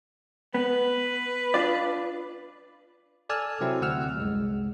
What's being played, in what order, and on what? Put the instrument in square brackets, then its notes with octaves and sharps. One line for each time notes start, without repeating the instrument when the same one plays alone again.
[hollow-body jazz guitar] B3 [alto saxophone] B4
[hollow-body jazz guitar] D4 F4 D5
[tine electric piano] A4 D5 G#5 E6 F6
C3 F#3 C4 E4 C5
D2 C3 F#5 E6 F6
C2 F#2 G#3